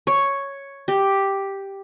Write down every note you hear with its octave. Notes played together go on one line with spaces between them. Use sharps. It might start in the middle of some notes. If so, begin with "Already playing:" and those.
C#5
G4